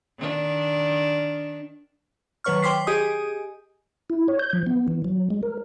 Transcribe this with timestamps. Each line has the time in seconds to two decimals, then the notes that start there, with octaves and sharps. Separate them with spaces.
0.19 D#3 D4
2.44 D#3 F#3 B4 C#5 C#6 F6
2.62 C5 G5 C6 D6 B6 C7
2.87 G4 G#4 D#5 G#5 D#6
4.10 E4
4.28 C#5
4.39 G6
4.53 F3
4.66 B3
4.88 E3
5.05 F#3
5.30 G#3
5.43 A#4